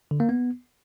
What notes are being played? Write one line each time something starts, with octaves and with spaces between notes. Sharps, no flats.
D3
A#3
B3